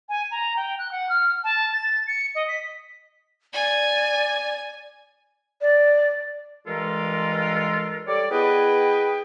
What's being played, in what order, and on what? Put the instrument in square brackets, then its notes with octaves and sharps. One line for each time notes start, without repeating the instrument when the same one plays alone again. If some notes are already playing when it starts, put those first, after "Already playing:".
[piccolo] G#5
A#5
G5
F#6
F#5
F6
A5
A6
C#7
D#5
B6
[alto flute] D5 [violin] G#5
[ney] D5
[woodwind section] G2 E3 G#3 F4 A4 A#4
G3 A4 C#5 D5
B3 E4 G#4 B4 D#5 G5